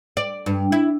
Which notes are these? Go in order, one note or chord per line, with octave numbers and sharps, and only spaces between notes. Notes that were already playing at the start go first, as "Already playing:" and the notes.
D5
G2
E4